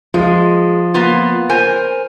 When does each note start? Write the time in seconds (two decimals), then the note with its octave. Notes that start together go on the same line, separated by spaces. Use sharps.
0.14 F3 G#3
0.94 A#3 B3 F4
1.49 A#4 C5 G#5